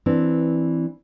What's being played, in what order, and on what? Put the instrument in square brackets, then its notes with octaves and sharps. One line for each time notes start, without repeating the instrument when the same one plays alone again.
[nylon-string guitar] E3 C4 D4